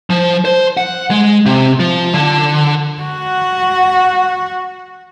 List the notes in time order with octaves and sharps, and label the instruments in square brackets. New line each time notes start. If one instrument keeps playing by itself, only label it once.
[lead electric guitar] F3
C5
F#5
G#3
C3
F3
D3
[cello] F#4 F#5